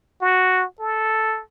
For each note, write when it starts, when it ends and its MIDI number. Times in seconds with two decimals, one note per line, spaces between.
0.21 0.65 66
0.79 1.42 69